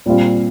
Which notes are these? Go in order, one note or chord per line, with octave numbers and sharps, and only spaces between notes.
A#2 G3 C4 F4